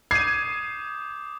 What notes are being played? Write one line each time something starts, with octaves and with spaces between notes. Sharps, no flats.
D6 D#6 G6 G#6 C7 D#7